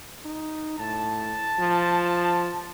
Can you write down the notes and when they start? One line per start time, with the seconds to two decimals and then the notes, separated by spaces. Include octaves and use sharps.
0.25 D#4
0.79 A2 A5
1.59 F3